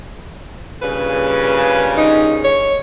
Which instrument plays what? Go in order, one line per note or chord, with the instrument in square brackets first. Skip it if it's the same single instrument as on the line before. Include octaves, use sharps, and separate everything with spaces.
[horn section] G2 A#2 C#3 [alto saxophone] B4
[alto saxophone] D#4
C#5